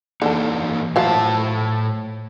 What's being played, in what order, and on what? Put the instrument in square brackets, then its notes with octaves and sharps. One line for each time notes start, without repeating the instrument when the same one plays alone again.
[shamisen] D3 A4 [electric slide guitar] E3 A#3 D#4
[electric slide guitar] A2 A5 [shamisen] F3 F#3 E4